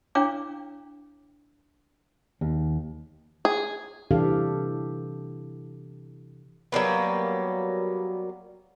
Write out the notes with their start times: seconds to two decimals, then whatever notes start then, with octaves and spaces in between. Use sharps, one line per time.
0.15 D4 E4 C#5 F5 G5 D6
2.41 D#2
3.45 G#4
4.11 C3 E3 D4 G4 A4 F5
6.72 F#3 G3 A#3 B3